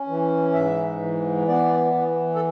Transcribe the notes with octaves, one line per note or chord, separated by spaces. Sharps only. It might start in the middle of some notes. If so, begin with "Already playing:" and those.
Already playing: C#4
E3
G#2 E5
E3
B3 D5
E3
A4